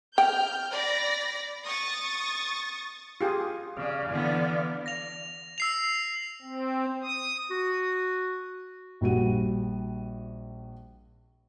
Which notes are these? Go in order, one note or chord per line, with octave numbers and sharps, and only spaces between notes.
G5 F6 G6
D5 B5 A#6
C#6 D#6 A6
F4 G4 G#4
C#3 D5 F5
D3 E3 B3
A#6 F7
E6 C7 F7
C4
D#6
F#4
A#1 G3 F#4 D#7